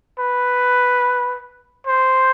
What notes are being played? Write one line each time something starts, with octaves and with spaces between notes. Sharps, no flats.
B4
C5